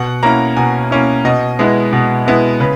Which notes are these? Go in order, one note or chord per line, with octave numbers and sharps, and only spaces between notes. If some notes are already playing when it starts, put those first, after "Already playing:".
Already playing: B2 F#5
A#3 C#4 E4 A#5
B2 G#5
A#3 C#4 E4
B2 D#5
G#3 B3 E4
B2
G#3 B3 E4
C#3 B4